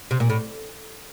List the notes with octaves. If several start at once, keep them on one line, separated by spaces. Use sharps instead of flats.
C3
A#2
A2